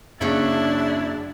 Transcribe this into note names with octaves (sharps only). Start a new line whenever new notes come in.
F#2 C#3 A#3 C#4 D4 E4 G#4 A6